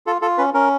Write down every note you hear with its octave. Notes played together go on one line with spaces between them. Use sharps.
F4 A4
F4 A4
C#4 B4
C#4 A#4